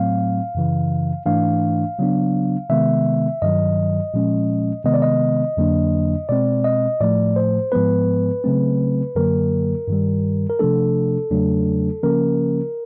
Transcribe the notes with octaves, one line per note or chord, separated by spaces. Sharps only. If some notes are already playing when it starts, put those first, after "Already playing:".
Already playing: A2 F#3 A3 C4 F5
F#2 C#3 E3
G#2 E3 A3 D4 F5
C#3 F#3 B3 D4
C3 D#3 G#3 B3 E5
G2 D#3 F#3 D#5
A#2 F3 G#3 C#4
C3 D#3 G#3 B3 D#5
D5
D#5
F2 D3 F#3 A#3 D4
B2 G#3 C4 D5
D#5
A2 F3 A3 D5
C5
G#2 F3 G#3 B3 B4
C#3 F#3 A3 C4
F#2 D3 F#3 A#3 A#4
G2 D#3 G3
A#4
C3 F3 A3 D4 A4
E2 C#3 F#3 A3 D4
C#3 F3 A#3 C#4 A#4